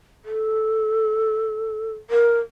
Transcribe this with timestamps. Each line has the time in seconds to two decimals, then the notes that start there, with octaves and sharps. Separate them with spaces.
0.25 A4
2.10 A#4